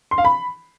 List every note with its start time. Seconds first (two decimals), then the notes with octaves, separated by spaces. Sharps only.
0.11 C6
0.18 F5
0.25 B5